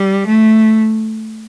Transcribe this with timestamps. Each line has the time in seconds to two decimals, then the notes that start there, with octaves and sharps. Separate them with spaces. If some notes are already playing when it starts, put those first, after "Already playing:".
Already playing: G3
0.26 A3